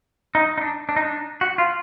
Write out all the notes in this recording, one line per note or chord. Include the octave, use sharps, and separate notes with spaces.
D#4
D#4
D4
D4
D#4
D4
F#4
F4